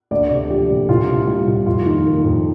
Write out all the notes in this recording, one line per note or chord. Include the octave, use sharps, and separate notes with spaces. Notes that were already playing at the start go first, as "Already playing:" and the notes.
D2 D5
C3
F3 G4
D2
C2 F4
C3
G3 F4
C2
F2 F4
D#3
A#3
F2